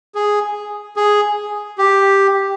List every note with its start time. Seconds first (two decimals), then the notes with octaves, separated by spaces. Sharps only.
0.15 G#4
0.96 G#4
1.78 G4